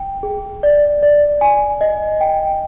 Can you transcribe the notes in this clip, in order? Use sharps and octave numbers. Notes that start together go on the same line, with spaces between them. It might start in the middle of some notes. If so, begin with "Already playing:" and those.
Already playing: G5
G#4
D5
D5
G#5
D#5
G5